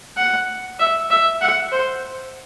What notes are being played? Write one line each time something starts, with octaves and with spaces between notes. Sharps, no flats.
F#5
E5
E5
F#5
C5